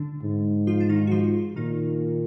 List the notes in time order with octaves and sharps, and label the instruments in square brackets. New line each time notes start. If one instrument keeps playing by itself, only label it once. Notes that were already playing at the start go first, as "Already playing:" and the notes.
Already playing: [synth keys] D3 D4
[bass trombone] G#2
[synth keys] F3 F4
D4
D#3 D#4
F#4
F3 F4
[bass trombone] A#2 [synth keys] D#3 D#4